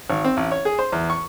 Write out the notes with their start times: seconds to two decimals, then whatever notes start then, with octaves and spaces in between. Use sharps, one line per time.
0.10 G#1
0.24 C4
0.37 A1
0.51 C#5
0.65 G#4
0.79 C5
0.92 E2
1.10 C#6